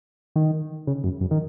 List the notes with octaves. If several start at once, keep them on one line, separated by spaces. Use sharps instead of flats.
D#3
C#3
F#2
F#2
D#3